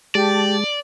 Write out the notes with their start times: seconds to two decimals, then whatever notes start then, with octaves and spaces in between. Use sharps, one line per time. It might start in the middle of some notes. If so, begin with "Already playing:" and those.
0.15 G#3 G4 D5 A5